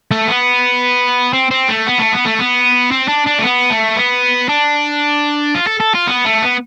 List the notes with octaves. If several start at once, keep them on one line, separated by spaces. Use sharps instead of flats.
A3
B3
C4
C4
A3
B3
A3
B3
A3
B3
C4
D4
D4
A3
B3
A3
B3
D4
F4
A4
A4
F4
B3
A3
B3